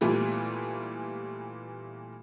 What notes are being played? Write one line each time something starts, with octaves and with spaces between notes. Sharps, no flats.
A#2 E3 G3 A3 B3